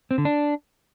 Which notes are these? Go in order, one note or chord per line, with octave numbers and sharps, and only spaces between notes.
C4
D3
D4